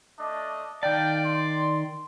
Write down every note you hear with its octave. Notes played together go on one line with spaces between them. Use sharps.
A3 D4 D#5
D#3 D5 F5 G5 A5
C6